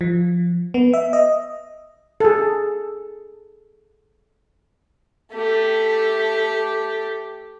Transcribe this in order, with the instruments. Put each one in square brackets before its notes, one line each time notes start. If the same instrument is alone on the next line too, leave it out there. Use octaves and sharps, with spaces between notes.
[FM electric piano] F3
B3
E5
D#5
[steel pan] G#4 A4
[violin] A3 G4